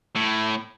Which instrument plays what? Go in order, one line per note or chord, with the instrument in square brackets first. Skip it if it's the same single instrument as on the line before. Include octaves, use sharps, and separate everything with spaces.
[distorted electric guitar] A2